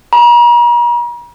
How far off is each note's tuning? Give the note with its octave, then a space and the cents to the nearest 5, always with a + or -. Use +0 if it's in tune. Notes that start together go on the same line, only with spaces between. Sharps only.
A#5 +45